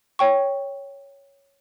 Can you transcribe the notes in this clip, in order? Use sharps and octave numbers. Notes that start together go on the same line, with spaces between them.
C#5 G5 C#6